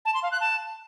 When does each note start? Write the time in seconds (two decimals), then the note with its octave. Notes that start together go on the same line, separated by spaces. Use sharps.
0.05 A5
0.14 C6
0.23 F5
0.32 F#6
0.40 A5